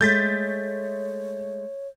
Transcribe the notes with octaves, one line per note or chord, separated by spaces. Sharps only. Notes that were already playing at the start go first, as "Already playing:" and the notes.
G#3 A3 C#5 G6 A6 B6